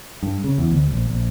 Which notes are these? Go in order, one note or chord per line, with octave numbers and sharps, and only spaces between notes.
G2
C#3
E2
D2
A#1
A#1